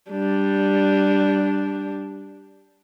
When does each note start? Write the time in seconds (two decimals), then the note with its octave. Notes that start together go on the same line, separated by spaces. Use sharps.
0.10 G3 D4